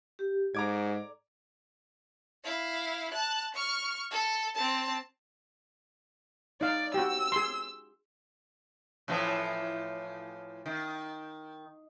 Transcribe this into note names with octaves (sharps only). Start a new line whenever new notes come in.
G4
G#2 A4 D5 A#5 D6 G#6
E4 F5
A5 F#6
C#6 F6
A4
C4 A5
D#4 D5 F5
F#4 G4 E6
G#4 C6
A2 E3 F3
D#3